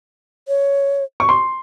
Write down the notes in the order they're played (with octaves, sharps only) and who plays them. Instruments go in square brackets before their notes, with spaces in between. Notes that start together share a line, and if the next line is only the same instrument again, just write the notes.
[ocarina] C#5
[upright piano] C#6
C6